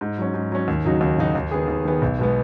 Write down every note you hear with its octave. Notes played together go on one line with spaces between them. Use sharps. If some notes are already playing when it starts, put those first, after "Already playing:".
G#2
F#3 C#4
G#2
F#3 C#4
D#2
C#3 F#3 D#4 F#4
D#2
C#3 F#3 D#4 F#4
D#2
D#3 B3 G#4
D#2
D#3 B3 G#4
B1
B2 G#3 B3